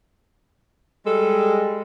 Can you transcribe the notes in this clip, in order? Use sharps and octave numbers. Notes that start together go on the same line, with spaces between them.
G3 G#3 A4